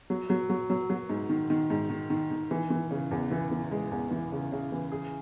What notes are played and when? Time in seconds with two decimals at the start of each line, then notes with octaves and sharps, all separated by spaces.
0.10 F#3
0.30 F#3
0.50 F#3
0.70 F#3
0.90 F#3
1.09 G#2
1.29 D#3
1.50 D#3
1.70 G#2
1.90 D#3
2.10 D#3
2.31 D#3
2.51 E3
2.70 E3
2.91 C#3
3.11 E2
3.31 E3
3.51 E3
3.71 G#3
3.91 E2
4.11 E3
4.32 C#3
4.52 C#3
4.72 E3
4.92 G#4